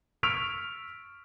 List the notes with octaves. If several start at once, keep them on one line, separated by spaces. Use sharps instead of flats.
C#6 E6 F6 B6 D7 F7